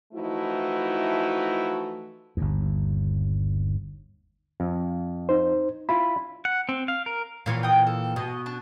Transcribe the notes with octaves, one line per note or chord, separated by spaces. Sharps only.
E3 F3 A3 D#4 E4 F#4
G1 D#2
F2
D#4 C5
E4 F4 B5
F#5
C4
F5
A#4
A#2 E3 F3 C#5 F5
G5 D#6
A4
B2 D#5
D4